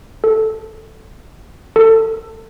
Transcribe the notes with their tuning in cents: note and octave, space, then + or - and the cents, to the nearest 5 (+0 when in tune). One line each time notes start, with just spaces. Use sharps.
A4 -5
A4 +25